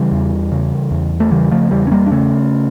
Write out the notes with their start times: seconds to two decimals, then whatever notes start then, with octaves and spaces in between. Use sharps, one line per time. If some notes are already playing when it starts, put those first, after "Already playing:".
Already playing: C#3 E3 G3
0.12 E2
0.52 C#3
0.91 E2
1.20 A3
1.31 C#3 E3 G3
1.51 F3 A3
1.71 E2 E3 G3
1.87 C#4
1.91 G3 A#3
2.07 D4
2.11 C#3 A3 C#4